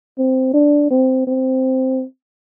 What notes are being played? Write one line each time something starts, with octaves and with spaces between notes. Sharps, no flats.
C4
D4
C4
C4